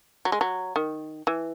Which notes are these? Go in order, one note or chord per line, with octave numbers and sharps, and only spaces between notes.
F#3
G#3
F#3
D#3
E3